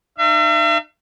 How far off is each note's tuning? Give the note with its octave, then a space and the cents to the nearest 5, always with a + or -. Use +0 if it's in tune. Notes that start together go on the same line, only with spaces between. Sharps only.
D#4 -40 E5 +45